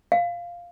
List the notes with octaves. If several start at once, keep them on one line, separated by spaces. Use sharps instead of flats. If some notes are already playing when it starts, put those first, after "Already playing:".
F5